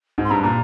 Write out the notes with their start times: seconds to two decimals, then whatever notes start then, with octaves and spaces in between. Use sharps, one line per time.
0.18 G#2
0.25 C6
0.30 G2 A#5
0.43 A#2 A#5